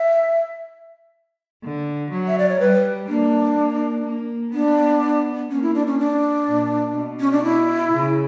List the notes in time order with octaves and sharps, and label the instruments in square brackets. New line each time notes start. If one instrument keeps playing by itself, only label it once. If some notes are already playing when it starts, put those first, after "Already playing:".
Already playing: [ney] E5
[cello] D3
F#3
[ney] E5
D5
C#5
[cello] G3 [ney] B4
[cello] A#3 [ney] D4
[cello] A#3
A#3
[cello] B3 [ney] D4
[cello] A#3 [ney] C#4
[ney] E4
D4
C#4
D4
[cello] A#2
B2
[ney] C#4
D4
E4
[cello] C#3